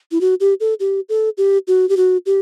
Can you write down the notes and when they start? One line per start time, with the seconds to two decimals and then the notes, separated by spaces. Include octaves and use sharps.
0.12 E4
0.21 F#4
0.40 G4
0.60 A4
0.80 G4
1.09 A4
1.38 G4
1.67 F#4
1.89 G4
1.97 F#4
2.26 G4